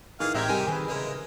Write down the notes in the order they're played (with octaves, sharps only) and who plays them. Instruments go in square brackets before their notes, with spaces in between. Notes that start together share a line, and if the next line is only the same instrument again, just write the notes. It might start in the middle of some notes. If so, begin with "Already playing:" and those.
[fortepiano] G#2 [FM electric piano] D#3 E3 [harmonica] G#4 F5
[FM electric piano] A1 F6 G#6 [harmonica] G#3 G4 [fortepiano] C4 E5 A#5
[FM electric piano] C3 [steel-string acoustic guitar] G3 A#4 G#5
[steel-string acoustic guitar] D#3 C5 [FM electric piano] G#4 B4
[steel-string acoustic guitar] C#3 E3 A#4 [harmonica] G#3